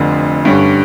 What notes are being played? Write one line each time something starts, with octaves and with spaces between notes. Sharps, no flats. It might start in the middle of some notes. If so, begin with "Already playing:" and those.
Already playing: F1 F2 D3
G2 D3 G3 C#4